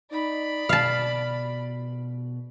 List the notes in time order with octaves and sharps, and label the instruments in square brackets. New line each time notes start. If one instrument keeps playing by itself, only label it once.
[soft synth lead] D#4 [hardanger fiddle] D5 B5
[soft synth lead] B2 [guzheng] F5 A5